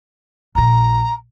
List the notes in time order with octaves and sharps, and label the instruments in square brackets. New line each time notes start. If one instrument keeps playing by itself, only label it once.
[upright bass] A#1 A#2 [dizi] A#5